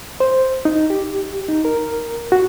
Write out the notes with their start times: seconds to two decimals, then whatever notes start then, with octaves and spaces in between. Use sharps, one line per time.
0.20 C5
0.65 D#4
0.90 G4
1.49 D#4
1.65 A#4
2.32 F#4